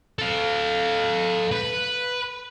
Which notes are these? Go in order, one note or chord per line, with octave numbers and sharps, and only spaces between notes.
A4 F5
B4